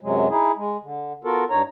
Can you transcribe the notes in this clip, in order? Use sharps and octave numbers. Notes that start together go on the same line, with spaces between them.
F#2 C3 F#3 G#3
D#4 E4 G#4
G#3
D3
B3 F4 F#4 A4 A#4
G2 D#4 C#5 A#5